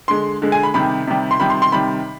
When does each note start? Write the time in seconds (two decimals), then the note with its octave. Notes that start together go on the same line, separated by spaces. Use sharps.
0.08 D3 G#3 C6
0.42 D3 G#3
0.52 G#5
0.63 B5
0.74 C3 D#3 G3 B5
1.07 C3 D#3 G3
1.31 C6
1.40 C3 D#3 G3 B5
1.50 C6
1.62 C6
1.72 C3 D#3 G3 B5